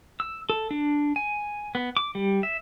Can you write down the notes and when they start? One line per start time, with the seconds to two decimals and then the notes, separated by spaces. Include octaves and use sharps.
0.20 E6
0.50 A4
0.71 D4
1.16 G#5
1.75 B3
1.97 D6
2.15 G3
2.43 E5